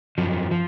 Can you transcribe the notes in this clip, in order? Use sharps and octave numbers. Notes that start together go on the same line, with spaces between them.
F#2 F3
F3